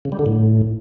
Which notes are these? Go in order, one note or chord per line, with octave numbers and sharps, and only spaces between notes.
C#3
G3
D3
A2